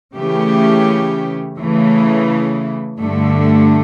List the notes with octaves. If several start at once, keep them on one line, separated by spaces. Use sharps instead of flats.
C#3 E3 A3 C#4 G4
C#3 E3 A3
G2 D3 A3